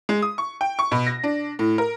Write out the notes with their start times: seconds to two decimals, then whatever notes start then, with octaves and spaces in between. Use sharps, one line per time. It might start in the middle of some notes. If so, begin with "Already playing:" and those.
0.09 G#3
0.22 D#6
0.38 C#6
0.61 G5
0.79 C#6
0.92 B2
1.07 A#6
1.24 D4
1.59 A2
1.78 A#4